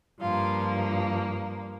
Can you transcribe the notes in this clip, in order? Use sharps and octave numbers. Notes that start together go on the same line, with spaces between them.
G2 F3 A#3 F4